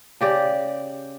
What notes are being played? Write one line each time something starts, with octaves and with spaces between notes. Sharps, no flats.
C#3 G4 D5